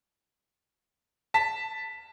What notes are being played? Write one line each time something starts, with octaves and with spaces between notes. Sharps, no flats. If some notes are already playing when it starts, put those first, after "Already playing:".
A5 B6